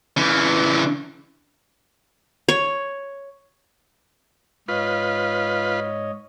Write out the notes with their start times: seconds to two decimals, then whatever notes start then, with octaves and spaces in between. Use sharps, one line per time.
0.17 C#3 E3
2.49 C#5
4.68 G#2 F4 B4 C#5 D#5